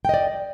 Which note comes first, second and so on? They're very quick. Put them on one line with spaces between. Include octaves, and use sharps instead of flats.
G5 D#5 D5